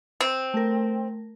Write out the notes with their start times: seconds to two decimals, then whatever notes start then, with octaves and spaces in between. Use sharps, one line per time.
0.21 C4
0.54 A3 A#4